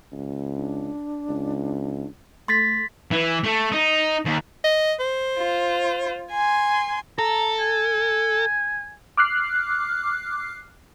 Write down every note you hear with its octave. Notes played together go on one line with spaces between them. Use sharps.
C#2
D4
C#2
A3 A4 C6 A6 B6
E3
A3
D#4
D#2
D#5
C5
F4
G#5 C6
A4 A#5
G#5
D6 F6 F#6 C7